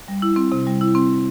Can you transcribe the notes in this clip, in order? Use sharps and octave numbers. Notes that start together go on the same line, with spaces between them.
G3
E4
C4
C3
G3
E4
C4